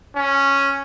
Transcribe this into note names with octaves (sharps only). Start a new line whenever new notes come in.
C#4